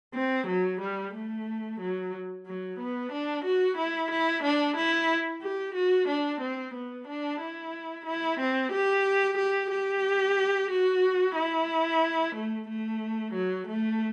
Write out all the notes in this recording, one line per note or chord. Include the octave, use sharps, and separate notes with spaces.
C4
F#3
G3
A3
F#3
F#3
B3
D4
F#4
E4
E4
D4
E4
G4
F#4
D4
C4
B3
D4
E4
E4
C4
G4
G4
G4
F#4
E4
A3
A3
F#3
A3